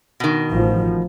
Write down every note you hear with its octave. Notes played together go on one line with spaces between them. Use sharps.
B2 D#3
A1 F3